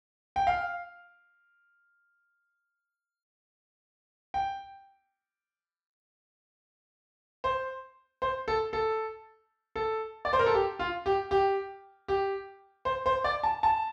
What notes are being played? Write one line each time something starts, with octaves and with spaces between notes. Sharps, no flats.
G5
F5
G5
C5
C5
A4
A4
A4
D5
C5
A#4
A4
G4
F4
G4
G4
G4
C5
C5
D5
A5
A5